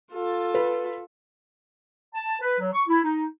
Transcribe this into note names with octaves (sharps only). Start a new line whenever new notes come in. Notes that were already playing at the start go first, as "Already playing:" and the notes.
F4 A4
B4
A5
B4
F#3
C#6
E4
D#4